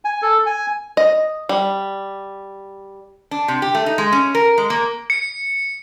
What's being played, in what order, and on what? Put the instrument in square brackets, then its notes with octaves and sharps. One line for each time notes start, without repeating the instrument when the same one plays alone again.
[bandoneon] G#5
A4
G#5
[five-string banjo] D#5
G3
[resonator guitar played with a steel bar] D4
C3
G4
A3
D#4
G#3
C#4
A#4
G#3
A#3
[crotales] C#7